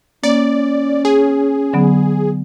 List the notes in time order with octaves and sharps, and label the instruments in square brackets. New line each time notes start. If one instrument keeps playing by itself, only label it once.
[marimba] A#3 [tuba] C#4 [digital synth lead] D5
[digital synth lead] G#4
[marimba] D3 F#3 B3